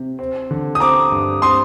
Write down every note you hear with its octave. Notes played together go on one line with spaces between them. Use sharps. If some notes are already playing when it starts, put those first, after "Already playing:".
Already playing: C3
C4
D3
D#6
C4 A#5 D6
G2
C4 C6 D#6